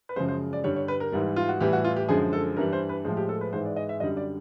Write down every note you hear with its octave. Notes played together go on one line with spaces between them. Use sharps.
B4
F#2 C#3 F3 G#3 C5
C5
D5
G2 D3 G3 C#5
C#5
B4
A#4
G#2 E3 G3
F4
F#4
A2 E3 G3 G4
F#4
F4
G4
F#2 D3 F3 G#3 G#4
A4
G2 E3 G3 A#4
C5
B4
A2 F3 G#3 C5
G4
A4
B4
G#2 E3 G#3 C5
D5
D#5
E5
F#2 D3 G3 D#5
D5